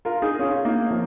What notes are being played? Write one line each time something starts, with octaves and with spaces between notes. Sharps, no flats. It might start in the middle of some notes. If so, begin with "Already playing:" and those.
F4 A#4
D#4 G#4
C#4 F4
A#3 D#4
F3 A#3